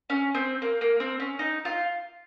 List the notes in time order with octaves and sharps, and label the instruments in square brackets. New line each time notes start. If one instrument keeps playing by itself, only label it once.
[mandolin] C#4
C4
A#3
A#3
C4
C#4
D#4
F4